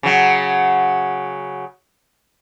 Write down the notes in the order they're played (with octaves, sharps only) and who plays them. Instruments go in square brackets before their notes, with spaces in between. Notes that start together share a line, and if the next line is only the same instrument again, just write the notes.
[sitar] C#3 F#3